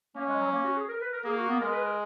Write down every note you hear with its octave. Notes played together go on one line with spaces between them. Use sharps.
A#3 C#4
G#3
F#3
A#3
F#4
G#4
A#4
B4
A#4
A#3 G#4
F#4
B3
G#3 A#4
B4
A#4